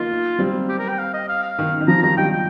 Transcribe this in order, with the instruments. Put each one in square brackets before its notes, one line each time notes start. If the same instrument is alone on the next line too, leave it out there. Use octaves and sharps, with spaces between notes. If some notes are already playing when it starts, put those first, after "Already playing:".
Already playing: [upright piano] A#3 D#4 [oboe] F4
[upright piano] G3 C4
[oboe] G4
A#4
G5
F5
D#5
F5
F5
[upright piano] D#3
D#3
[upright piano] F3 [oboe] A#5
[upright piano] D#3 G3 [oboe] A#5
[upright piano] D#3 G3 [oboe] G5
[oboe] G5